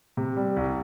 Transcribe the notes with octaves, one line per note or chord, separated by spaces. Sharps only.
C3
G3
C2